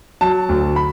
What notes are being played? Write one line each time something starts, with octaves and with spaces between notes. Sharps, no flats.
F#3 A5
D2
B5